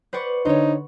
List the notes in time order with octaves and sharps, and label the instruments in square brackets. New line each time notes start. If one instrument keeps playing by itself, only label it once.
[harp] B4 F#5 C#6 [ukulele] C5 D5
[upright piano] D3 [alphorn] D#4 [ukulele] C5 C#5